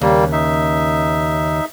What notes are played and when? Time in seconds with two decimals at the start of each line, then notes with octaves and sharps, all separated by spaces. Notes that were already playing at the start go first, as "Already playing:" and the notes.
0.01 D#2 C#3 G3 A#3
0.32 D#4 E5